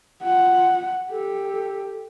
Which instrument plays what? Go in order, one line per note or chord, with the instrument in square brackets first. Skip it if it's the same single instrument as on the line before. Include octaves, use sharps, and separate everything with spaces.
[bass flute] F4 [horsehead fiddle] F#5
[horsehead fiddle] G4 [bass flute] A4